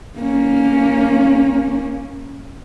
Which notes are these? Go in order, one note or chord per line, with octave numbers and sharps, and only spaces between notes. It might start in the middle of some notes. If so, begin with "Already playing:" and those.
A#3 C#4